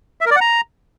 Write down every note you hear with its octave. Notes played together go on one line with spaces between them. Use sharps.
E5
A#4
D5
F#5
A#5